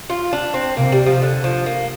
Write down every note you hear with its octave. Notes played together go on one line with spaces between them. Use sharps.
F4
D4
C4
C3 A#3
G3
F3
D3
F3
A#3